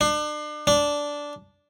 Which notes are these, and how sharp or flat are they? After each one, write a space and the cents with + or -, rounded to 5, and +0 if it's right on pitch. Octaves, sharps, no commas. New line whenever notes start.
D4 +35
D4 -10